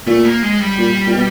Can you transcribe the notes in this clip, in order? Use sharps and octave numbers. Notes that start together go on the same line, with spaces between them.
A#2 A3
A#3
G#3
G3
A#2
A#2
B2